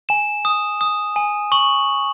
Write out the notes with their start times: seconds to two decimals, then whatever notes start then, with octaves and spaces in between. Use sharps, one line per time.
0.09 G#5 E7
0.45 D#6
0.81 D#6
1.16 G#5
1.52 C#6 F#7